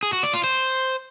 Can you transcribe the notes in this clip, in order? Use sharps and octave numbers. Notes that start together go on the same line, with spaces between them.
G#4
F#4
D5
F4
C5